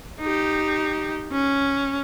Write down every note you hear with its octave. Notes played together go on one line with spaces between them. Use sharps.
D#4 G4
C#4